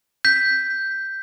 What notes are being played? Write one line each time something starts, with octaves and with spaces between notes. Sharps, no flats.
G6 B6